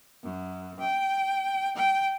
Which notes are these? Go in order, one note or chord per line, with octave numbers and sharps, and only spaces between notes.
F#2
G5
G5